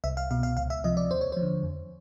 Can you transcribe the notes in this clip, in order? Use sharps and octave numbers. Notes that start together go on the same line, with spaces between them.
C2 E5
F5
B2 F5
F5
C#2 F5
E5
C3 F3 D#5
D5
D#2 C5
C#5
F3 C5
D3
F2